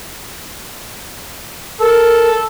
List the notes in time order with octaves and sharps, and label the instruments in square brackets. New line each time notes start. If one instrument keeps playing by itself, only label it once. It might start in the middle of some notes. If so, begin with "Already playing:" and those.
[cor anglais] A4 [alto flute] A#4